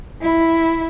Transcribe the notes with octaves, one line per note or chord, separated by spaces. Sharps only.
E4